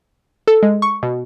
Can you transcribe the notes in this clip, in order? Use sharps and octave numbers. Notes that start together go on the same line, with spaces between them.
A4
G#3
C#6
B2